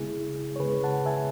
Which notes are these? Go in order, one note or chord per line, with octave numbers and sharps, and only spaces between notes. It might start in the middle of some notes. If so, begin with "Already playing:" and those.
Already playing: C#3 G#3 B3 E4 G#4
C#5
C#3 G#3 B3 G#4 B4
F#5 A5
E5 G#5